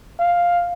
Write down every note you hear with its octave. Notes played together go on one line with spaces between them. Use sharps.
F5